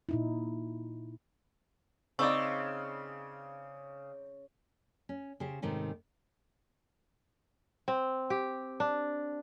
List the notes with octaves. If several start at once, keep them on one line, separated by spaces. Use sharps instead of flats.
A#2 D#4 E4
C#3 C4 D#4 D5 C#6 E6
C#4
C#3 G4 C5
G#2 C3 D#3 A3 C#4
C4
G4
D4